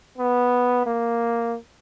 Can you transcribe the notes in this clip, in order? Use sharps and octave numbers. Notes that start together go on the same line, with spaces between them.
B3
A#3